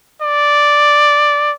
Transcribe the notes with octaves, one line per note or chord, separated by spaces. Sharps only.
D5